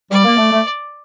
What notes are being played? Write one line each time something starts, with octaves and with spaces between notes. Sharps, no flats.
G3 D5
A#3
A3
A3